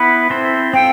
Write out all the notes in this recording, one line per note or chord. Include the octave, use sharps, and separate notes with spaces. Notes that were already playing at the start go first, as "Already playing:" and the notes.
Already playing: B3 E4 B4
C4 E4 A4 C5
C4 F4 A4 G5